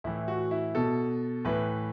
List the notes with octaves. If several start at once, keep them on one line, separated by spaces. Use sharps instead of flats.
A2 E3 E4
F#4
E4
B2 A4
A2 E3 B4